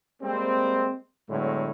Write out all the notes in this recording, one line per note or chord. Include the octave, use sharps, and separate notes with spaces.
G3 G#3 A#3 C4
A2 D3 F#3 G#3 B3